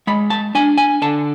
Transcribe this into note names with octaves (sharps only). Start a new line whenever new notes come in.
G#3 B5
A5
D4 G#5
G#5
D3 A5